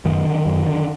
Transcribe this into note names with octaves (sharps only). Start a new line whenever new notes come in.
F#2 D#3
D3
F#2
D3